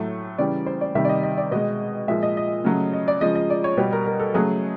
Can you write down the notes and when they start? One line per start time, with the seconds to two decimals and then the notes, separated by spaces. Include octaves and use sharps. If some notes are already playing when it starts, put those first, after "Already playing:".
Already playing: A2 F#3 A3
0.38 C#3 E3 G3 D5
0.66 C5
0.81 D5
0.95 C3 D#3 G3 E5
1.05 D5
1.09 D#5
1.23 D#5
1.38 D5
1.51 B2 G#3 D#5
2.08 A#2 F3 G#3 E5
2.23 D#5
2.37 D#5
2.64 C#3 F#3 A3
2.93 D#5
3.08 D5
3.21 C#3 F3 G#3 D#5
3.36 D#5
3.50 D5
3.64 C#5
3.77 B2 G3
3.93 A#4
4.06 A#4
4.20 A4
4.34 C#3 F#3 A3 G#4